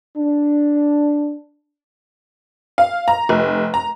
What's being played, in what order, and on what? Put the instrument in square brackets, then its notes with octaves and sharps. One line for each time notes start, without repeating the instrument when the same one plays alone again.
[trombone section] D4
[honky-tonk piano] F5
A#5
F1
A#5